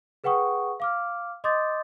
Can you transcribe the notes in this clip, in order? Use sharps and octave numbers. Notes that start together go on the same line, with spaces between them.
G#4 B4 F#5 G5 C#6 D#6
F5 D6 F6
D#5 C6 D6 D#6 G6 A6